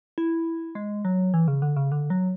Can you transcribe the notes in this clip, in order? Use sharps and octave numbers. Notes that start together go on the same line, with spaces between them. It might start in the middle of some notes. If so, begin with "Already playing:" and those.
E4
G#3
F#3
E3
C#3
D3
C#3
D3
F#3